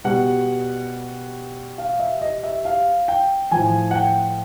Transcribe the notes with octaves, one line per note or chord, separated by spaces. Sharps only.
B2 G3 F#5
F5
E5
D#5
E5
F5
G5
A2 F3 G#5
F#5
G5